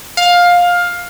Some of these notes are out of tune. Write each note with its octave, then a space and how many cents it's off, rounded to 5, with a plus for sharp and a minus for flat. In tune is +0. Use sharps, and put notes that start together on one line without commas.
F5 +15